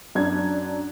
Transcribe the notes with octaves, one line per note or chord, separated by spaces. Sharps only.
F#2 D4 G#6